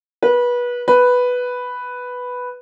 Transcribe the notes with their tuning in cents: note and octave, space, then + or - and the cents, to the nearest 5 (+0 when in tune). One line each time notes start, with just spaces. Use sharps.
B4 -25
B4 +0